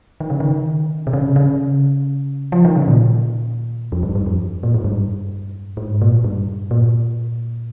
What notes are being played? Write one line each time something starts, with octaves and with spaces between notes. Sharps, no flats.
D#3
C#3
D#3
C3
C#3
C#3
F3
D#3
C#3
A#2
F2
G2
G2
F2
A#2
G#2
G2
G#2
A#2
G2
A#2